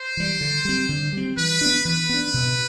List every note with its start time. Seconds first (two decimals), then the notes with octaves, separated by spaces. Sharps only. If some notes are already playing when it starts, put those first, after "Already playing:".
Already playing: C5
0.17 E3 G3
0.41 D3
0.65 G3 C4
0.89 D3
1.12 G3 C4
1.37 E3 B4
1.61 B3 D4
1.85 E3 B4
2.09 B3 D4
2.34 B2